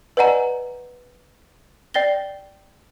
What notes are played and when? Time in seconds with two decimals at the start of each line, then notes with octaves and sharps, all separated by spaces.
0.17 B4 D5 D#5 F#5 G#5 A#5
1.94 D5 G5 A6 A#6 G7